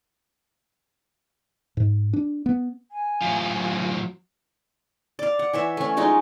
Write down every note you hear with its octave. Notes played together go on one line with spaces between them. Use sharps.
G#2
D4
B3
G#5
F#2 A2 F#3 F4
D5 F5
F#5
E3 C#5 E5
A3 C#4
F#3 G#3 D#4 F4